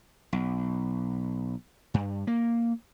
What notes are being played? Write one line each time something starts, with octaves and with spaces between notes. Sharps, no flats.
B1
G2
A#3